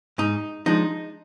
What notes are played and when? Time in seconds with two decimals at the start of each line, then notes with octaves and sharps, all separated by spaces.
0.18 G#2 D#4
0.66 F3 G#3 D4 D#4